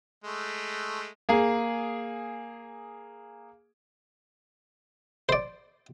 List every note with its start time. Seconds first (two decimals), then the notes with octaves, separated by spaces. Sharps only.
0.24 G#3 A3
1.29 A#3 G#4
5.29 C5 D5